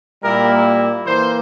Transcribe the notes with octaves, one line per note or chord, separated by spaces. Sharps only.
A#2 G3 A#3 E4 A#4
E3 A#3 E4 C5